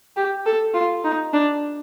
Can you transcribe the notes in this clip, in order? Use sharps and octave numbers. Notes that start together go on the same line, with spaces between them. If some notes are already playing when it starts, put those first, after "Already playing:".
G4
A4
F4
D#4
D4